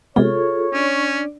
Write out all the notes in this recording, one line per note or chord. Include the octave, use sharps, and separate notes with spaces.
C3 G#3 B3 F4 G#4 A4 C#5
C#4 D4 D5